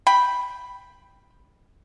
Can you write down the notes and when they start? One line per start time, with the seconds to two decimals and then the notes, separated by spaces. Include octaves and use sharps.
0.07 G5 B5